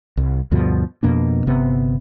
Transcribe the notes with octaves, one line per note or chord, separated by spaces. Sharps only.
C2
D2 G2 B2 F3
F2 B2 A#3 D4
G1 C3 B3